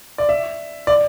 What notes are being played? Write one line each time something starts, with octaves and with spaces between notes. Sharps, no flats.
D5
E5
D5